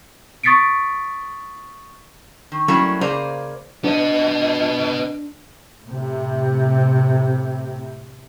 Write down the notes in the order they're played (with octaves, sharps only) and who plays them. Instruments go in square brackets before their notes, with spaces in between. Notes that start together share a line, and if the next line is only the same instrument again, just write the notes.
[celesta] C#6 D#6 A6 B6 C#7 D7
[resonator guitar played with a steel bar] D#3
F#3 G3 A3 A#3 C#4 E4
C#3 A#3 G#4 C5 D5 A#5
[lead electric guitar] B3 D#5 [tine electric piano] D4
[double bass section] A2 C3